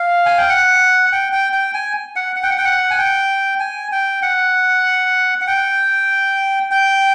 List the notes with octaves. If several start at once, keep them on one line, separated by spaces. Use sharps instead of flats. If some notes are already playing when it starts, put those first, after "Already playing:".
Already playing: F5
G#5
G5
F#5
G5
G5
G5
G#5
F#5
F#5
G5
F#5
G5
F#5
G#5
G5
G#5
G5
F#5
F#5
G5
G5